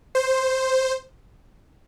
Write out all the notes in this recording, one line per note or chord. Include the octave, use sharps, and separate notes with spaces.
C5